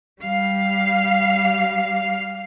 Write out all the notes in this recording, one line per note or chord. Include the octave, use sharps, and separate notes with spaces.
G3 F5